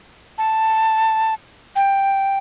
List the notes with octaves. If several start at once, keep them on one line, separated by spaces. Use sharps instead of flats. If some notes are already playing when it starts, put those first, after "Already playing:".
A5
G5